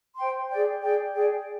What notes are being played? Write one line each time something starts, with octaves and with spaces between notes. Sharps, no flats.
C5 G5 C6
G#4 D5 G5
G#4 D5 G5
G#4 D5 G5